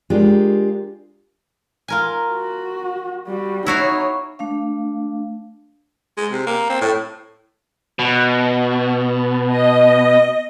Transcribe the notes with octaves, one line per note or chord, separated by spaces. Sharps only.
G#3 D4 F4 G4 A#4
F4 A#4 G#5
F#4
G3 F#4
D#4 E4 F#4 C#5 F5
A3 D4 F5
G#3
C3
A#3
C4
A2
B2
D#5